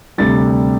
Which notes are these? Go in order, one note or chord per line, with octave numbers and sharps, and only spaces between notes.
D2 C3 G3 A6